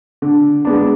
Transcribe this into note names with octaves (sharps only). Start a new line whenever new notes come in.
D3
G#3 B3 D4